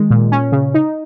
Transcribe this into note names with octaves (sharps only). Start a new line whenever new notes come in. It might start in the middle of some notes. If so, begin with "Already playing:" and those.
Already playing: D#3 G#3
A#2
C#4
C#3
D#4